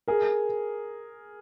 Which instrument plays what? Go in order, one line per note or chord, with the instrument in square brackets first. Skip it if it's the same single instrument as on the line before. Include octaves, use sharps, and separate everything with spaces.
[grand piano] G#4 A#4